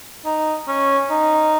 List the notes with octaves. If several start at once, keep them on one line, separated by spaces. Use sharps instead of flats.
D#4
C#4
D#4